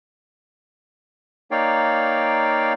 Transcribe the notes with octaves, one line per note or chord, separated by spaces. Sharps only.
A#3 D#4 C#5 D5 F5 G5